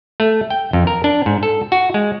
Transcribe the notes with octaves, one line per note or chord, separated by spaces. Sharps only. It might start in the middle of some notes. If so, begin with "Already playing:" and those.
A3
G5
F2
A#4
D4
G#2
A4
F#4
G#3